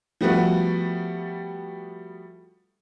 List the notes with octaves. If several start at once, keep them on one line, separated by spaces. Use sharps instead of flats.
F3 G3 A3 B3 F#4 B4